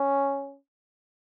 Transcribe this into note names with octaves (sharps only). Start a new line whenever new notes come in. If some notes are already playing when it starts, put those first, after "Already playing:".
Already playing: C#4